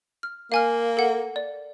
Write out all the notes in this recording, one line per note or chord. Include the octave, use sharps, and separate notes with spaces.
F6
A#3 F5 G#5 F6
A4 F#5
D5